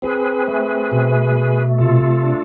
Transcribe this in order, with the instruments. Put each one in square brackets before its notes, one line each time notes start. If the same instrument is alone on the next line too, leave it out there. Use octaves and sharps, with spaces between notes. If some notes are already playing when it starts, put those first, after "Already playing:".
[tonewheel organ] C4 G#4 B4
A3
B2
A3
C3 F4 A4
D4